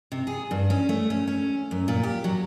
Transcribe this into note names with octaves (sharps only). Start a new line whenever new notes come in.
C3
G#4
G2
C#4
A3
C#4
C#4
F#2
A#2
G4
F#3